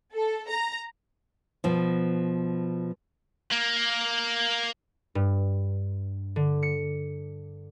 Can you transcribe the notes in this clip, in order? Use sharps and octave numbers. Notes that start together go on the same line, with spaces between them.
A4
A#5
B2 F3
A#3
G2
D3
C#7